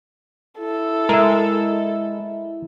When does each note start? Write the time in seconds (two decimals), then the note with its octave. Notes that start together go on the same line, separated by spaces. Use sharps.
0.60 E4 A4
1.09 G#3 A#4 E5